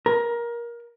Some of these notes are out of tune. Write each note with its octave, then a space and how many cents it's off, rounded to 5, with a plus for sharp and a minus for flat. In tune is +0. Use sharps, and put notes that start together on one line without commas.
A#4 +20